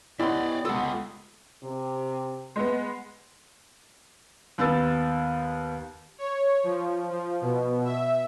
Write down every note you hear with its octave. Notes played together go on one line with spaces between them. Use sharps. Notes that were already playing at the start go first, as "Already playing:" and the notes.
B3 C#4 E4 G4 D5 D#5 C6
G#3 F4 A4 F#5
C3
G#3 B3
D#2 B3 E6 A6
C#5
F3
F3
B2
E5